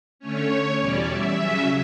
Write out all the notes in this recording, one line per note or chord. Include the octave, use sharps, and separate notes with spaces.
D3 A3 C#4 C#5
E2 B2 G3 C#4 D5
E5
C#3 F#3 C#4